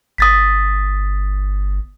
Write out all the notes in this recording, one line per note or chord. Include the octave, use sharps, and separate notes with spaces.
G1 D#6 A6 B6